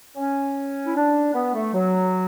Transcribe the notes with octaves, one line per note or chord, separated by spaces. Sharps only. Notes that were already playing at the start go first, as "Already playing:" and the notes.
C#4
E4
D4
B3
A3
F#3